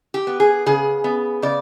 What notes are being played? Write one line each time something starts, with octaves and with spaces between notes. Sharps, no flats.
G4
B3
G#4
C#3 G#4
B3
C#3 D5